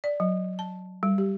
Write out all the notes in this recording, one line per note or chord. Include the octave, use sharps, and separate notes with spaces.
D5
F#3
A5
G3
G4